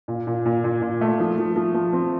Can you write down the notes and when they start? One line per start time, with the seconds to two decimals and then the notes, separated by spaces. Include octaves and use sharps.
0.08 A#2
0.27 A#2
0.45 A#2
0.64 A#2
0.82 A#2
1.01 A3
1.20 F3
1.38 F3
1.56 F3
1.74 F3
1.93 C4